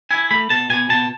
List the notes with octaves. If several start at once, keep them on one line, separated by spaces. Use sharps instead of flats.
E4 G#5
A3 B5
B2 A5
B2 G#5
B2 A5